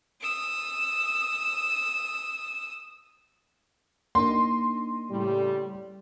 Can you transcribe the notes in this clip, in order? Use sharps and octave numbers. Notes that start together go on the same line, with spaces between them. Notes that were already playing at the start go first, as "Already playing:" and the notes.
D#6 E6
A#3 D4 D#4 C6
A2 C#3 G3